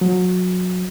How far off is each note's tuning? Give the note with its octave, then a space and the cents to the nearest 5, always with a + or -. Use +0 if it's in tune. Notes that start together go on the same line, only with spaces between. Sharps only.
F#3 -25